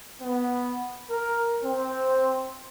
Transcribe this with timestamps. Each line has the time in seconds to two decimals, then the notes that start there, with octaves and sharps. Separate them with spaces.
0.21 B3
1.10 A#4
1.62 C4